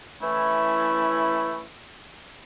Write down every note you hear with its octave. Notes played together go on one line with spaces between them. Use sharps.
E3 A3 C#4 E4